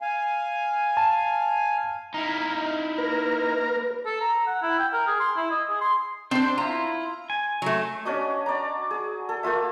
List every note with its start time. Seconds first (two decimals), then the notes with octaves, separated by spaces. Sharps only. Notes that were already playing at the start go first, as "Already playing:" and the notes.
0.01 F5 G#5
0.97 A5
2.14 D#4 E4 F5 A#5
2.98 A#3 A#4 B4
4.06 A4
4.21 A#5
4.47 F#5
4.62 E4
4.79 G5
4.93 A#4
5.07 G#4
5.20 C6
5.36 E4
5.51 D#5
5.69 G#4
5.81 C6
6.31 C4 D4 C5
6.58 E4 F4 A#5
7.30 G#5
7.62 F#3 A3
8.05 C#4 D4 F#4 D#5
8.46 D5 A#5
8.91 G#4
9.29 A4
9.43 A3 A#3 F4 E5